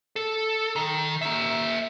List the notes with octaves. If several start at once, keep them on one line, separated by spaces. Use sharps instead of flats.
A4
D#3
A#3 E5